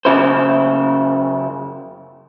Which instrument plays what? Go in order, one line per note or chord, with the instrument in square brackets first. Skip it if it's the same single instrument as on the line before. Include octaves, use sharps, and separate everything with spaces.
[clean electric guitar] F#2 C#3 E4 C5